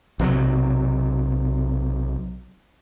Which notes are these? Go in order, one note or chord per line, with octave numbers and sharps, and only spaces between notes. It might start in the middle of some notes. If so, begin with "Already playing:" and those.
B1 C3 E3 F#3